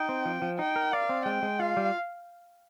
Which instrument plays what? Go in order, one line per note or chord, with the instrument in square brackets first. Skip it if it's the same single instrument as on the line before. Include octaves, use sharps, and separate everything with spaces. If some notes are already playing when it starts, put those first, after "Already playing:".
Already playing: [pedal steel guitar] D#4 [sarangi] G5
[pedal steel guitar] C4
F3
F3
[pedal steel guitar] D#4 [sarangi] G5
[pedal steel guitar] A#4
[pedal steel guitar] D5 [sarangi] F5
[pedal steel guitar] C4
[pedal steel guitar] G#3 [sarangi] G5
[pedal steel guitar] G#3
[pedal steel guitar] F4 [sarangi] F5
[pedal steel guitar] G3